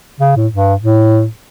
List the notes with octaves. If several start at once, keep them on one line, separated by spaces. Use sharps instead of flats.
C#3
A2
G2
A2